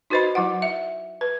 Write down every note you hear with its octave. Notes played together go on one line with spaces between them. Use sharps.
D#4 F#4 B4 C5 D#5 B5
F#3 E4 F#5
E5
B4